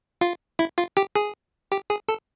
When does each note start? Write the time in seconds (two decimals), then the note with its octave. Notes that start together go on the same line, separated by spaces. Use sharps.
0.21 F4
0.59 E4
0.78 F4
0.97 G4
1.16 G#4
1.72 G4
1.90 G#4
2.08 A4